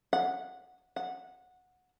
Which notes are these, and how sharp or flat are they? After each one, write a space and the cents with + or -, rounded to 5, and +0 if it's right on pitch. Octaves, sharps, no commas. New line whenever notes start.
F#5 -15
F#5 -15